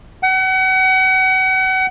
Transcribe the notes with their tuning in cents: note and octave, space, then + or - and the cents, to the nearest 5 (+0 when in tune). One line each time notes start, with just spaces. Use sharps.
F#5 +35